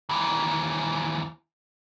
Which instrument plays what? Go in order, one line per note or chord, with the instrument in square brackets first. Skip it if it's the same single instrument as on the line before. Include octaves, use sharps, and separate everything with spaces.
[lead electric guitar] D#2 E3